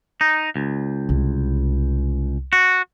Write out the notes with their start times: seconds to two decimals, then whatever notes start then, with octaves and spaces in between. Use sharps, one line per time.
0.21 D#4
0.56 C#2
1.09 C2
2.53 F#4